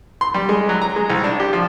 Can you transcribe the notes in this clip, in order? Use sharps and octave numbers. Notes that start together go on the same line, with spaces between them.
C6
G3
G#3
F#3
A#5
G#3
C2
D4
G4
F3